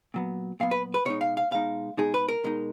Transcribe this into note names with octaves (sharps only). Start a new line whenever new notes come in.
A#2 F#3 B3
A#2 F#3 B3 F5
B4
B4
B2 G#3 D#4 C#5
F5
F5
B2 G#3 D#4 F5
B2 G#3 D#4 G#4
B4
A#4
B2 G#3 D#4